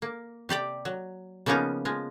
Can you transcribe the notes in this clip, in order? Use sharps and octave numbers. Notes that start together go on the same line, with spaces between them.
A#3
C3 G4 D5 G5
F#3
C#3 F3 A#3 B3 C#4 D#4
F3 G#3